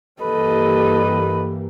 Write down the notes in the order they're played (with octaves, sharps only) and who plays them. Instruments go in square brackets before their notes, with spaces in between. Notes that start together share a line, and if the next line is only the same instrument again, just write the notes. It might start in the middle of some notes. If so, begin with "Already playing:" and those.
[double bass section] G2 E3 A#3 [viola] G3 G4 [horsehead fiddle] A4 D#5 [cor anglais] B4